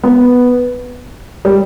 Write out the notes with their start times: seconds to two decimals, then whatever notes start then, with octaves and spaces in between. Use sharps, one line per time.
0.04 B3
1.45 G3